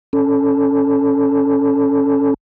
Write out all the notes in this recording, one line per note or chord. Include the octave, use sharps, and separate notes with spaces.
C#4 A4